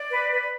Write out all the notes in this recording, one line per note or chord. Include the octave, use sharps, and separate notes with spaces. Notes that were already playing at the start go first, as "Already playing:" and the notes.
Already playing: D5
B4
B4